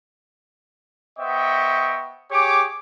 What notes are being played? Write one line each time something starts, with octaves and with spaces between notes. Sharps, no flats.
B3 C5 D#5 E5 G5 C#6
G4 G#4 C#5 D6